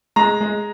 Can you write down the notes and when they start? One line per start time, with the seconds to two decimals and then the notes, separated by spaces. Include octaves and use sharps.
0.16 G#3 A#5
0.41 G#3